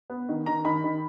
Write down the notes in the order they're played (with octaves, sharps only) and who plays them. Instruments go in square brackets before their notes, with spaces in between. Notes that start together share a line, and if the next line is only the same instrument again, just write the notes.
[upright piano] B3
D#3
D#3 A#5
D#3 B5
D#3